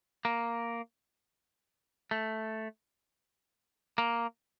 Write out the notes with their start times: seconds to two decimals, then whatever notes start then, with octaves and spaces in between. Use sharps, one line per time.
0.25 A#3
2.11 A3
3.98 A#3